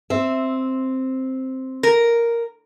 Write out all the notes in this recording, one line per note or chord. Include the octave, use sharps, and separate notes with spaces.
C4 E5
A#4